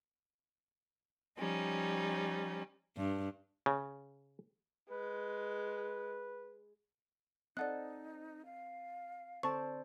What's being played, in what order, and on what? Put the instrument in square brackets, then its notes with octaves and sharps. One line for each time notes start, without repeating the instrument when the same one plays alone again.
[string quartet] F3 G3 C#4 D#4
[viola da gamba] G2
[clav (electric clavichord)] C#3
[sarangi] G#3 [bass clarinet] B4
[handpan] C4 [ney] D#4 [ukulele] A4 D#5 [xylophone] D5 F#5 F#6
[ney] F5
[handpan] D3 C4 C5 [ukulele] A4 D5 A5 [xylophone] C#6